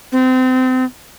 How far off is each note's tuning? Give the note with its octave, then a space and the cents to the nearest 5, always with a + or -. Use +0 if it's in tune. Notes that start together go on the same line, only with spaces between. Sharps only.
C4 -30